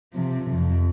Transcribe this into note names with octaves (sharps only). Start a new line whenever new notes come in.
C3 F3
F2